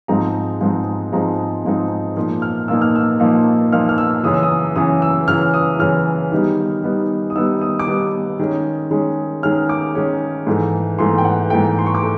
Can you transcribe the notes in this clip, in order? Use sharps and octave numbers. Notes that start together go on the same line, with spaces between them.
G#2 F3 G#3 C4 D#4 A#5
G#2 F3 G#3 C4 D#4
G#2 F3 G#3 C4 D#4 A#5
G#2 F3 G#3 C4 D#4
A#2 F3 A#3 D#4
F6
A#2 F3 A#3 D#4 E6
F6
E6
A#2 F3 A#3 D#4
A#2 F3 A#3 D#4 F6
F6
E6
F#2 C#3 E3 D#6
E6
D#6
F#2 C#3 E3 D#6
E6
F#2 C#3 E3 F6
D#6
F#2 C#3 E3 F6
D#3 G3 B3 D#4
D#3 G3 B3 D#4
D#6
D#3 G3 B3 D#4 E6
D#6
D6
D#3 G3 B3 D#4 D#6
D#3 G#3 C#4
D#3 G#3 C#4
D#3 G#3 C#4 F6
D6
D#3 G#3 C#4
G#2 E3 A3
G#2 E3 A3 C6
G5
F#5
G#2 E3 A3 G5
C6
C#6
D6
A3